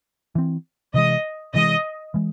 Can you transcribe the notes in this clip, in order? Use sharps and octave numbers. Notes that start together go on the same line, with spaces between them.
E3 C4
C3 E3 G#3 D#5
C3 E3 G#3 D#5
E3 G#3